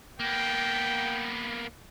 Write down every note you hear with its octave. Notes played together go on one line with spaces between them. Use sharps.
A#3 B3 G5